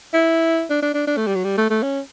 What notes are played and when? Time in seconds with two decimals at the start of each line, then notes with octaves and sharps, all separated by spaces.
0.13 E4
0.70 D4
0.82 D4
0.94 D4
1.07 D4
1.17 A3
1.27 G3
1.35 F#3
1.44 G3
1.58 A3
1.70 A3
1.83 C#4